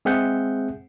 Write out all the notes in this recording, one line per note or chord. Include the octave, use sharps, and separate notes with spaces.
G#3 C4 G#4 E5 F#5 G6